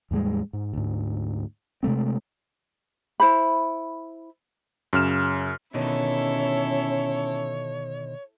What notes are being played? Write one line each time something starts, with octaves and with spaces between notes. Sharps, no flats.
E2 A2 G3 G#3
G#2
D2 G#2
C3 G#3 A3 C4
E4 C5 B5
F#2 C#3 F6 E7
B2 D3 D#3 C#4 E4 A4 C#5